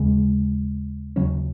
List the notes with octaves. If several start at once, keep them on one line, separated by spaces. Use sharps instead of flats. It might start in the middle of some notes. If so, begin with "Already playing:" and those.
Already playing: D#2 C#3 G#3
D#2 C#3 F#3 C#4